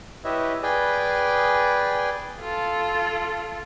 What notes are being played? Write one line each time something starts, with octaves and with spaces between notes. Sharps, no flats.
E4 G4 B4 C#5 D#5 E5
G#4 B4 D5 G5 G#5
F4 A4